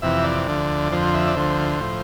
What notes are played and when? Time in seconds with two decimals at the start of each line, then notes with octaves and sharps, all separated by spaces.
0.02 F2 C3 E3 E5
0.24 D5
0.47 D2 D3 F3
0.91 F2 D3 F3 C5
1.14 E5
1.28 D5
1.35 D2 D3 F3 C5
1.80 A2 F3